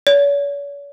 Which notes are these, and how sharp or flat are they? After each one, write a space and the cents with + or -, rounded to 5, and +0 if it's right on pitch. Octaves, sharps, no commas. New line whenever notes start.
C#5 +45